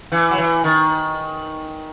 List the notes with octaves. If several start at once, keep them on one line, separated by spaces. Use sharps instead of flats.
E3
F#3
E3
D#3